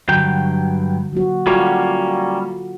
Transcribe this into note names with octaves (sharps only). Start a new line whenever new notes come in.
G2 D3 F#3 F#4 G5
F#3 A#3 F#4
G3 A#3 C#4 F4 F#4 A4